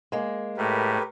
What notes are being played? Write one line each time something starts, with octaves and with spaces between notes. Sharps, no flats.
G#3 A#3
A2 G4 A#4 B4